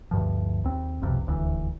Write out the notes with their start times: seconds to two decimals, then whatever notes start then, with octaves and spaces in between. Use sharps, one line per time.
0.11 D2 G2 F3
0.64 D#2 C4
1.02 D#1 B1 F2 C3
1.27 D#1 D2 B2 E3